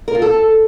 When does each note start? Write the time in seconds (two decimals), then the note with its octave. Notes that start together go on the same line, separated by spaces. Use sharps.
0.08 A#4
0.15 F4
0.22 A4